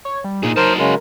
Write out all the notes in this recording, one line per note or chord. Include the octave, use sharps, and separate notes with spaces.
C#5
G3
A#2 D#4 G#4
F#3 A#4 C5 A5
C#3 G#3 A#4